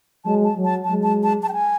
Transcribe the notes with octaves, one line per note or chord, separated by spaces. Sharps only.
F#3 G#3 A5
A5
F#3
A5
F#3 G#3 A5
A5
A5
A5
G5
G#5